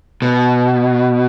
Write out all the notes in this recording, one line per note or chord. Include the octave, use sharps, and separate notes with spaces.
B2